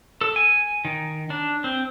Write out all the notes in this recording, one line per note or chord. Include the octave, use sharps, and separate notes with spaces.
A4
G#5
D#3
D4
C4